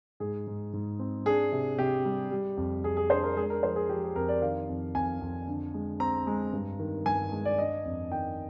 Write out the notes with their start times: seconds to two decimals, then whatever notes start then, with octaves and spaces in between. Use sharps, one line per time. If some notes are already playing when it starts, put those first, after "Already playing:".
0.20 G#2 G#4
0.47 G#2
0.73 G#2
0.99 C4
1.26 D4 G#4
1.52 C3
1.78 C3 G4
2.05 G3
2.31 G3
2.57 F2
2.84 F2 G#4
2.97 G#4
3.10 D4 C5
3.23 A#4
3.37 G#3 G#4
3.50 A#4
3.63 F3 C5
3.76 G#4
3.89 F3 G4
4.03 G#4
4.16 F2 A#4
4.29 D5
4.42 D#3 F5
4.69 F2
4.95 F2 G#5
5.21 F2
5.48 D3
5.74 G#3
6.00 C4 A#5
6.27 G#3
6.53 G2
6.79 D#3
7.06 G2 G#5
7.32 G#3
7.45 D5
7.58 D4 D#5
7.85 F2
8.11 D#3 G5